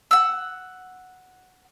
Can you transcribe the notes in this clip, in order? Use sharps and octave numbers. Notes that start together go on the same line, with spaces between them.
F#5 E6